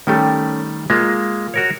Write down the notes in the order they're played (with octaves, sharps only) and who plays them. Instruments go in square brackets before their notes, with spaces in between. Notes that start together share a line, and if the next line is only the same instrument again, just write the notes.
[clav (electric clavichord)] D#3 G3 A3 [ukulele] C#4 G4 A4
[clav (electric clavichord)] G#3 A#3 [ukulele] F4
[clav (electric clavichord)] F#4 A#4 C#5